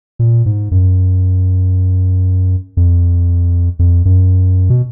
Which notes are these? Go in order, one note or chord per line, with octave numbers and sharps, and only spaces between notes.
A#2
G#2
F#2
F2
F2
F#2
B2